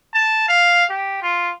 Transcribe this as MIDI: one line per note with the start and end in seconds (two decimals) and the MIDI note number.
0.14 0.44 81
0.48 0.85 77
0.90 1.20 67
1.22 1.52 65